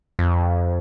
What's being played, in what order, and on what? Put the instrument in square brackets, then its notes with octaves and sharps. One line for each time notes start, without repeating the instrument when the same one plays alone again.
[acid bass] F2